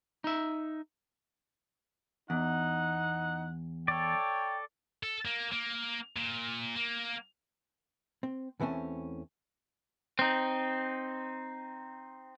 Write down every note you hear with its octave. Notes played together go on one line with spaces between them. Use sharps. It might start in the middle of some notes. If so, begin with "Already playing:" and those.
D#4 E5
E2 D#4 F#5
A4 C#5 D5 G5
A4
A#3
A#3
A#2
A#3
C4
E2 E3 A3 C4 C#4
C4 D#4